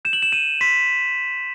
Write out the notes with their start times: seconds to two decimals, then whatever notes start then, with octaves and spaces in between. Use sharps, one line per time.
0.05 G6 E7
0.13 F#7
0.22 E7
0.32 G6 D#7
0.61 C6 B6